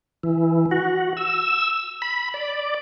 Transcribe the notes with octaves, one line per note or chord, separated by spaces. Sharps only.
E3
F#4
E6
B5
D5